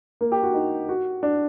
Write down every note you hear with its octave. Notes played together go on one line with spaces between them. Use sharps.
A#3
G4
F#4
D#4
F#4
D4